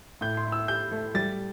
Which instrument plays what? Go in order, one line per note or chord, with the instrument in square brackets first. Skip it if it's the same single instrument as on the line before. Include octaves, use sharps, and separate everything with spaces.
[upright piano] A2 [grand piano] G6
[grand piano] C6
[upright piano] E4
[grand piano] E6
[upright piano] G4 [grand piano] G6
[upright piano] A3
[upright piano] G3 [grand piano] A6